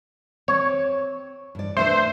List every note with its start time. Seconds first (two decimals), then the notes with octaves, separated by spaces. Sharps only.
0.48 C4 C#5
1.55 G2 D5
1.77 A3 D4 B4 C5 E5